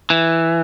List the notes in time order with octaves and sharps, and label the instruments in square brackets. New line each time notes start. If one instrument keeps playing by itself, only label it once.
[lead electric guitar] E3